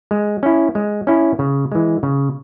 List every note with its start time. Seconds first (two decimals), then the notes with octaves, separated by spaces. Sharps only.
0.11 G#3
0.43 C#4 E4
0.75 G#3
1.07 C#4 E4
1.39 C#3
1.72 E3 G#3
2.03 C#3